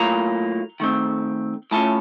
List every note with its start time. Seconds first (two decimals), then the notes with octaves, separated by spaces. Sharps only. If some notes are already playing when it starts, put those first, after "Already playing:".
Already playing: A2 F#3 A#3 F4 A#5
0.80 D#3 A3 C4
1.71 A2 A3 C#4 F4 A5